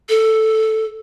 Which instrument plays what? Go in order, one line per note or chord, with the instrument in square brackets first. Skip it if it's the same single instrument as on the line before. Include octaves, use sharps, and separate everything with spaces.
[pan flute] A4